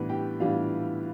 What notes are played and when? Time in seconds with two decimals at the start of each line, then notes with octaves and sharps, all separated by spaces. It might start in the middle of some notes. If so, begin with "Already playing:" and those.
Already playing: A2 E3 G3 B3 D4 B4
0.09 G4 G5
0.40 A2 E3 G3 B3 D4 F4 F5